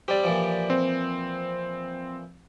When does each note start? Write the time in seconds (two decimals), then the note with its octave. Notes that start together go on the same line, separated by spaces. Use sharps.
0.08 G3 C4 G4 D5
0.24 A#2 E3 F3
0.70 C4